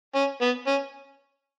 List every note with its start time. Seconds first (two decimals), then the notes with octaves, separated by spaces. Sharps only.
0.15 C#4
0.41 B3
0.67 C#4